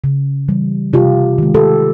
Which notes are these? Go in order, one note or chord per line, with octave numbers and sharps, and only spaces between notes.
C#3
E3 G3
C3 F4 G4
D#3 G#3
G4 A4